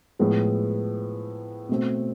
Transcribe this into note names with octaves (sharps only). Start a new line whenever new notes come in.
A2 F3 G#3 B3
B2 A3 C4